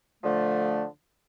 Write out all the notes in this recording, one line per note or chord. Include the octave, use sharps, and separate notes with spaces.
D3 F3 A3